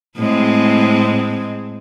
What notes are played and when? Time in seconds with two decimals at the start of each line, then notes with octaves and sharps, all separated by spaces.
0.17 A2 G#3 C4